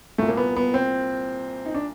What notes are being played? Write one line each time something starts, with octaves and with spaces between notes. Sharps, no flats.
C2 A#2 A3
A#3
B3
B3
C4
D#4
D4